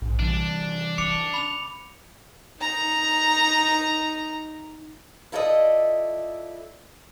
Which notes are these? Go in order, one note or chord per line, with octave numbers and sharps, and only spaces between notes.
A#1 G#2
C3 E3 G3 D4
D#3
C#3 D6 C#7 F7
B5 F7
D#4 A#5
E4 F4 A4 B4 D5 D#5